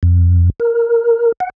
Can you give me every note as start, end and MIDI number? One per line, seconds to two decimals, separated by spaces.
0.03 0.50 41
0.60 1.32 70
1.40 1.50 78